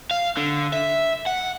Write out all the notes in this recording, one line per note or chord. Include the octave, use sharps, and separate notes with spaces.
F5
D3
E5
F#5